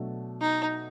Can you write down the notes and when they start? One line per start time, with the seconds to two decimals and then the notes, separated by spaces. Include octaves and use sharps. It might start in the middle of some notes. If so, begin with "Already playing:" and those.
Already playing: B2 F#3 A3 D4
0.41 D#4